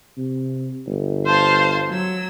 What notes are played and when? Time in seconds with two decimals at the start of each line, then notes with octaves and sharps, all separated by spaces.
0.17 C3
0.87 G1
1.25 C5 F5 A5
1.88 F#3 E6